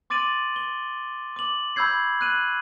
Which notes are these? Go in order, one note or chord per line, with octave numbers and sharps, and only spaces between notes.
C6 D6 A6 D7 D#7 F#7
G7
D6 F#7
B5 C#6 E6 G6 G#6 C7
F#6 D#7 F#7